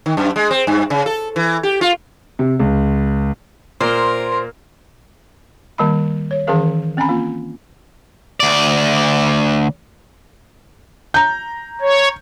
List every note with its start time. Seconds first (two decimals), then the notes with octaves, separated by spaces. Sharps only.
0.06 D#3
0.17 F#2
0.36 G#3
0.51 C4
0.67 G2
0.90 C#3
1.06 A4
1.36 E3
1.63 G4
1.81 F4
2.39 C3
2.60 C#2
3.81 A#2 A#4 C5 C6
5.78 D#3 G3 A#3 B5
6.31 C#5
6.47 D#3 E3 C#4 G#4 A#4 F5
6.97 C4 C#4 G#5 A#5 B5
7.09 A#3 F4
8.40 D2 D5
11.14 A#5 G6
11.81 C#5